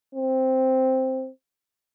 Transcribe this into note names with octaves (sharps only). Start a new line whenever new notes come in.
C4